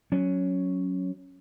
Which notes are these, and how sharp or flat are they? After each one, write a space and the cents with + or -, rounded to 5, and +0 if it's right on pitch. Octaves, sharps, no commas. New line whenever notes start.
F#3 +0 C#4 +0